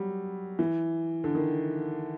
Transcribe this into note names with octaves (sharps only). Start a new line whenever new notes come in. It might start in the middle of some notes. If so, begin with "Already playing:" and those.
Already playing: F#3 G3
E3
D3
D#3